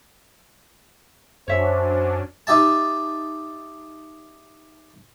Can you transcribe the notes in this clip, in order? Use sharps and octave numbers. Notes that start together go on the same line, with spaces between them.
F#2 F#3 C#4 D4 C5 C#5 E5
D#4 G4 E5 A5